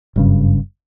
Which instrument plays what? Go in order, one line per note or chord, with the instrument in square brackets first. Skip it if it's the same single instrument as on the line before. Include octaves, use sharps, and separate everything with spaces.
[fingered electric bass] F#1 G2 C#3